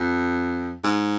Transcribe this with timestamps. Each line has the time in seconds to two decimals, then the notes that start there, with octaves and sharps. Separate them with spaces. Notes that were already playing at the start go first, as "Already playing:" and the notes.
Already playing: F2
0.84 G#2